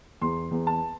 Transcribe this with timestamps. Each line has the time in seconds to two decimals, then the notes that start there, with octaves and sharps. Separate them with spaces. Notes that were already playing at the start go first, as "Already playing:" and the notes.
0.21 E2 C6
0.51 E2
0.67 A5